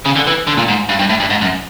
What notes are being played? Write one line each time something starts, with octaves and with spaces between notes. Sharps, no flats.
C#3
D3
E3
D3
A#2
G#2
G2
G2
A2
G2
G#2
F#2